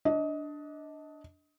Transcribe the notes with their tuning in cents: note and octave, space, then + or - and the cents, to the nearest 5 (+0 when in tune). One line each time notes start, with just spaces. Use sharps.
D4 +0 D#5 +20